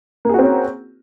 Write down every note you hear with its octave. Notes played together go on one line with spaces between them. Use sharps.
A#3 C4 C#4 F#4 G#4